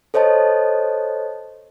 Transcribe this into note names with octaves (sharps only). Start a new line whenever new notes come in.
A4 C5 C#5 D#5 A5